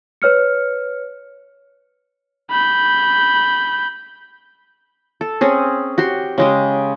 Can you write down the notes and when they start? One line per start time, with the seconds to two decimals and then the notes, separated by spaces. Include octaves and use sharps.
0.22 B4 C#5 F6 C#7
2.52 B5 G6
5.21 A4
5.41 C4 C#4 G#4
5.98 F#4 G4 C6
6.38 C#3 G#3 G4